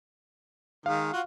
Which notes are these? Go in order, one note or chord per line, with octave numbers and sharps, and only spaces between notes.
D#3 G#3 F5
F4 F#4 F#5